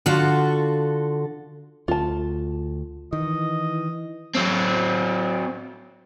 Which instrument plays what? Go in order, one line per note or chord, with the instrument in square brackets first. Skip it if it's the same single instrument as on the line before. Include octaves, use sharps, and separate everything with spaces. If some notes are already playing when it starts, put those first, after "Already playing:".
[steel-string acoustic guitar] D3 F4 F#4 A4
[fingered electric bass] D2 [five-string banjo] F4 A5
[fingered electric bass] D#3 [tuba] E3 [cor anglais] D#5
[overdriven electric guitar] F#3 C4